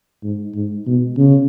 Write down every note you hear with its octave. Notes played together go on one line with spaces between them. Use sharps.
G#2
G#2
B2
C#3